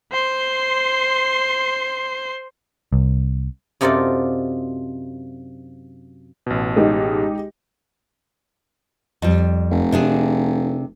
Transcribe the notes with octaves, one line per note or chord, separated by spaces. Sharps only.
C5 C6
C2
F#2 C3 D#4 F4 A4 D5
A1 B2
G#3 D#4 G4
F2 G3
F1
C3 D4 G#4